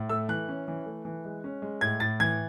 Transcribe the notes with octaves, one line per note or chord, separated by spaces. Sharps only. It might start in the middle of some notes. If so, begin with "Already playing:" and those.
Already playing: A2
A3 E6
E3 F#6
C#4
E3
A3
E3
G#3
C#4
G#3
A2 G#6
A2 A6
E3 G#6